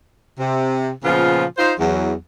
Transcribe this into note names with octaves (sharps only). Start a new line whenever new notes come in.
C3
A#2 C#3 F3 B3 F4
D#4 F4 C5
E2 F#3